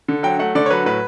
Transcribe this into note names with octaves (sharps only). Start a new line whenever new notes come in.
D3
F#3 G5
A3 F#5
D3 D5
C#5
F#3 B4
A2 B4